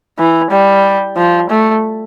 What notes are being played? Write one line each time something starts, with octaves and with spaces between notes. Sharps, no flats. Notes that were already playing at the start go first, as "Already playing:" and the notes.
E3
G3
F3
A3